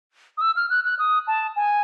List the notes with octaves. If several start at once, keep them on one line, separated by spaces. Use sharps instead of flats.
D#6
E6
F6
F#6
F#6
D#6
A5
G#5